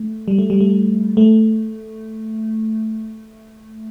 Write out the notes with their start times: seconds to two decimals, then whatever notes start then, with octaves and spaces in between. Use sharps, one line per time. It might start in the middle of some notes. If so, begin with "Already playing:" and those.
Already playing: A3
0.28 G3
0.39 A3
0.50 G3
0.61 A3
1.17 A3